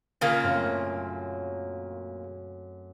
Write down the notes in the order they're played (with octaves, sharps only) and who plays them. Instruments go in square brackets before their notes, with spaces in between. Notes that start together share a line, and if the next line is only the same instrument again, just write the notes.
[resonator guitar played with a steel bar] A#2 C#3 A#3
[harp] F#2 A3 C4